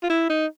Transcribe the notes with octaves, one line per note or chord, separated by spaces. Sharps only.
F4
E4
D#4